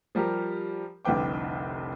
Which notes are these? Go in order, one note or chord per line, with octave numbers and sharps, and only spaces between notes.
F3 G3 G4 A#4
F1 C2 D3 B4 G5 D6